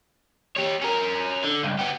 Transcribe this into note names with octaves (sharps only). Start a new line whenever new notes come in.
G4 C#5
C#4 A#4
D3
C#2 G2
B3 G4